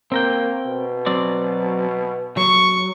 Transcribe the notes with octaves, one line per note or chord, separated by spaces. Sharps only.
A#3 C4 A#4 G5
B2
F#3 C4 D5
F#3 C#6